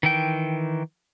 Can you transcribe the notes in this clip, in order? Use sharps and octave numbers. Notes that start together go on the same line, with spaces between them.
D#3 E3 G5